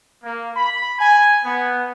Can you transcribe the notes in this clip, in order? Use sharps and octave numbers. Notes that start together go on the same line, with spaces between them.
A#3
B5
G#5
B3